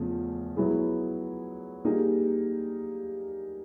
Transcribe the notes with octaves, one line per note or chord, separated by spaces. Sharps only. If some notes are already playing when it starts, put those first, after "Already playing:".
Already playing: E2 C#3 F3 A3 C#4
F#3 B3 E4 G#4
G3 A#3 D#4 G#4